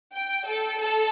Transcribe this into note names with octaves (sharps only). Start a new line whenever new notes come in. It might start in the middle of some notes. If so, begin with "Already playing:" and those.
G5
A4
A4